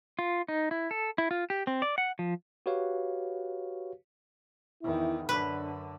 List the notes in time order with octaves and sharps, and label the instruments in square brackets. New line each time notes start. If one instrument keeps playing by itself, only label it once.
[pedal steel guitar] F4
D#4
E4
A4
E4
F4
G4
C4
D5
F#5
F3
[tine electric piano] F#4 G4 B4 C#5 F5
[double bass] E2 D#3 [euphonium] E4
[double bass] F#2 D3 [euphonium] D4 [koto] B4